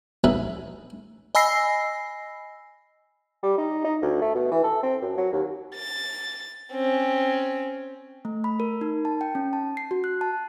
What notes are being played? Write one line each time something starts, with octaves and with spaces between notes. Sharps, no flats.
A#1 E3 D#4 B4 E5 G#5
D#5 G#5 B5 E6 A#6 C7
G3
D#4
D#4
D2
A3
B2
E3
A4
C4
F#2
F#3
D#2
A6
C4 C#4
A3
B5
A#4
D#4
A5
G5
C#4
A5
C7
F#4
F#6
A5